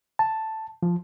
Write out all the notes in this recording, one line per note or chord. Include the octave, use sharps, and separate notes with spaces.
A5
F3